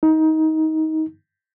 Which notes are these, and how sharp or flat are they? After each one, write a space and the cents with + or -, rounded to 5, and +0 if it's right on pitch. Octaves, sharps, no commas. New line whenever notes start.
D#4 +20